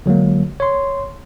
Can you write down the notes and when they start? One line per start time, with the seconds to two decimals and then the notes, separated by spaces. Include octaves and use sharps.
0.06 D3 F#3 G#3 A#3
0.60 C#5 C6